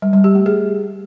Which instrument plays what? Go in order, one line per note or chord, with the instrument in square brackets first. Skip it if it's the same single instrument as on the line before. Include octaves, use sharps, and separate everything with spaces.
[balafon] G3
G3
G4
A3
G#4